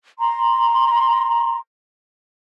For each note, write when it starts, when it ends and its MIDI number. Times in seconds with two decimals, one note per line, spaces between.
0.19 1.58 82
0.19 1.58 84